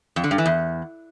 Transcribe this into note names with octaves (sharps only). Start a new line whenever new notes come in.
F2
D3
G2
E3
E2